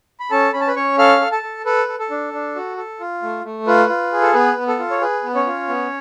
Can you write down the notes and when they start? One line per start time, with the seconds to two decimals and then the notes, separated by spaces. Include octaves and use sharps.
0.20 B5
0.31 C#4 A4 A5
0.53 C#4 B5
0.61 A5
0.67 B4 B5
0.76 C#4 C#5 C#6
0.98 A4 F5 F6
1.21 A4
1.32 A4 A5
1.43 A4
1.66 A4 B4
1.88 A4
1.99 A4
2.11 D4
2.33 D4
2.56 F#4
2.77 A4
3.00 F4
3.22 A3
3.45 A3
3.67 F4 B4
3.89 F4
4.12 G#4
4.21 A4
4.34 B3 B4
4.57 B3
4.68 A4
4.79 F4
4.91 C#5
5.01 G#4 B4
5.23 B3
5.35 C#4 C#5
5.46 F4
5.68 B3